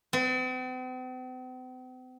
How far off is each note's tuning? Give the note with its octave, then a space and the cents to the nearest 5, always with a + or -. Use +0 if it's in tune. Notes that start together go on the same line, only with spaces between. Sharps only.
C4 -45